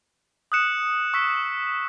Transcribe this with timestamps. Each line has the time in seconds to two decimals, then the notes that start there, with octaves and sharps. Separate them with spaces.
0.52 D#6 F#6 C#7 E7
1.14 C#6 E6 B6